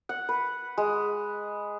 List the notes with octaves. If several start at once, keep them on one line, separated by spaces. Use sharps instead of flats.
F#5
B4
G#3